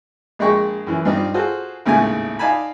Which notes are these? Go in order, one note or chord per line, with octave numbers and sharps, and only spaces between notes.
A#1 G#3 G#4 D#5 G5 C#6
F#2 E3
G2 C4 D4 D#4 F4
F4 F#4 G#4 A4 C5
G#1 D#2 A2 C#3 A3 G#5
D#4 D5 F5 G#5 A5 B5